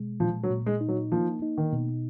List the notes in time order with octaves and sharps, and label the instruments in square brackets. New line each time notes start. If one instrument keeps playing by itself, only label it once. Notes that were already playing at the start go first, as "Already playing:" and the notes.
Already playing: [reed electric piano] B2 G#3
[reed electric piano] A#2 [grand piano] F3
[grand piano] F#3
[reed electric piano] A#2
[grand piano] G#3
[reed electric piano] D#4
[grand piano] F#3
[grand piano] F3 [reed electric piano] A#3
[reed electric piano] D#4
[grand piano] D#3
[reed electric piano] B2